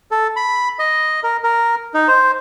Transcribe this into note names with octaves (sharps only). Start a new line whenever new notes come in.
A4
B5
D#5
A#4
A#4
D#4
C5